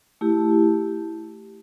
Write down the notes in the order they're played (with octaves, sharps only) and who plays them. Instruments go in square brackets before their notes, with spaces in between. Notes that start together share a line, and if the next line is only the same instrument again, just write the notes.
[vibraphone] A3 E4 G4